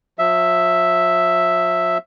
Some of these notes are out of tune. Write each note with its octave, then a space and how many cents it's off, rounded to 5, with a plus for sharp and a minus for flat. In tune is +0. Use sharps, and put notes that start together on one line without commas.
F3 +40 E5 +0